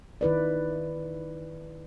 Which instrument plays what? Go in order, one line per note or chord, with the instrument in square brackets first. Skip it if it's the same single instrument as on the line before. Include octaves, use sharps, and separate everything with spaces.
[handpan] D#3 E4 B4 D5